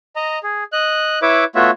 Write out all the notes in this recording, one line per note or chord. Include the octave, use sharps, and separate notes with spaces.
D#5 A#5
G#4
D#5 F#6
E4 B4 C#5 E5 D6
A3 B3 F4 F#4 C#5 E5